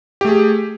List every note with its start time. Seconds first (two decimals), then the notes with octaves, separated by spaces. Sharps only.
0.21 G4
0.25 A3
0.28 G#4